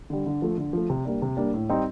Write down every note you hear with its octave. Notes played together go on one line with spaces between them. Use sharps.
D3 G3
D3
F3 A3
D3
F3 A3
C3
G3 A#3 D4
C3
G3 A#3 D4
A2
G3 C4 D#4